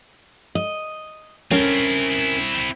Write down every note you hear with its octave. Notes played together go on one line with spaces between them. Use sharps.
D#5
C4 C#4 E4 A#4 A5